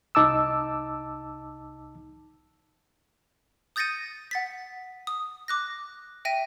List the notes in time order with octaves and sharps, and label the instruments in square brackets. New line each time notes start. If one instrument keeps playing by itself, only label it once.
[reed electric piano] C2 D#4 A5 D6 E6
[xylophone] D#6 G6 A6 A#6 C#7 D#7
F#5 A6 B6
D#6
D6 F#6 A#6
E5 G5 A#6 D#7